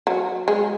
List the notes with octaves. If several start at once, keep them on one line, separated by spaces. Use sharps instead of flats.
F#3
G#3